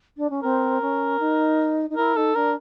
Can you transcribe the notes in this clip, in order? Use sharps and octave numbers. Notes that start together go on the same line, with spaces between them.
D4
C#4
C4 A#4
C#4
D#4
D#4
E4 A#4
D#4 A4
D4 A#4